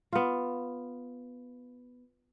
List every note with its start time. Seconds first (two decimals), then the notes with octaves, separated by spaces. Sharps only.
0.13 B3 F4